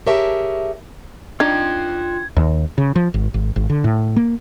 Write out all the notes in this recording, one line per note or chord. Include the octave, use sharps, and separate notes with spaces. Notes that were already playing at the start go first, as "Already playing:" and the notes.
G4 G#4 A#4 C#5 E5 A5
D4 D#4 F4 G5 G#6
D#2
C#3
F3
G#1
G#1
G#1
D3
A2
A#3